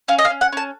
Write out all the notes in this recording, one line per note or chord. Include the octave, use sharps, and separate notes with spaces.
C#4 F5
D#5
F5
C#4
F#5
C#4 A5